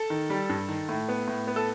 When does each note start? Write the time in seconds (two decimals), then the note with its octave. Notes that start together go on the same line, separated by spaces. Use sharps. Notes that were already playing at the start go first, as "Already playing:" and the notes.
Already playing: A4
0.10 D#3
0.30 G3
0.49 G2
0.68 D#3
0.89 A2
1.09 B3
1.28 A2
1.47 B3
1.56 A4